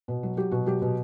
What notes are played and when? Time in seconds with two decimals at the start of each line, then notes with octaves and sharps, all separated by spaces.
0.08 B2
0.23 F#3
0.37 F#3 G4
0.52 B2 F#4
0.66 F#3 G4
0.82 B2